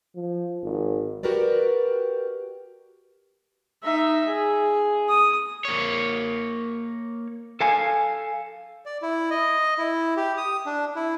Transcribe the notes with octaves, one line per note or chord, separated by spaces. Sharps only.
F3
G#1
F#4 G4 A#4 B4 D5
D#4 E5
G#4
D#6
A#3 C#5
A4 F5 G#5
D5
E4
D#5
E4
G4
D#6
D4
E4